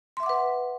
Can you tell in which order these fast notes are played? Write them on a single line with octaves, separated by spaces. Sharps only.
C6 E5 D6 F#5 B4